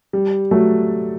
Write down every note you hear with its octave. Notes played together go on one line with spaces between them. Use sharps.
G3
F#3 A3